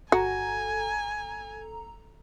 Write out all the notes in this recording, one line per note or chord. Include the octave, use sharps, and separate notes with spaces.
G1 F#4 A4 G#5 A#5